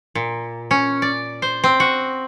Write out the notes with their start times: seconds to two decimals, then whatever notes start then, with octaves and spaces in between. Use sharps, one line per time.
0.15 A#2
0.71 C#4
1.02 D5
1.42 C5
1.64 C4
1.80 F#4